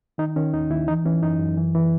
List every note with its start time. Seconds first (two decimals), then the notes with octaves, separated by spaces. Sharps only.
0.18 D#3 D#4
0.36 D#3 C#4
0.54 D#2 D#4
0.71 D#2 E4
0.88 E3 D#4
1.05 E3 C#4
1.22 F#2 D#4
1.40 F#2
1.57 E3
1.75 E3